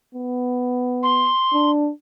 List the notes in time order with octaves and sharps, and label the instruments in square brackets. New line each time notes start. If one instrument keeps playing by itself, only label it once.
[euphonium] B3
[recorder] C6
[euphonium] D4